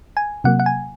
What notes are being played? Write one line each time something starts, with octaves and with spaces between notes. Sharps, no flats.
G#5
C3 F#3 A#3 F#5
F#5
G#5